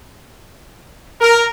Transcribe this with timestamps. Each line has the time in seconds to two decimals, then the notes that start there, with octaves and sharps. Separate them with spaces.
1.21 A#4